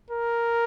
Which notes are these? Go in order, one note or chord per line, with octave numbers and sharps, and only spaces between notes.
A#4